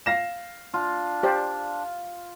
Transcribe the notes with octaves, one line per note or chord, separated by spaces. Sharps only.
F5 A#6 E7
D4 F4
G4 C5 D5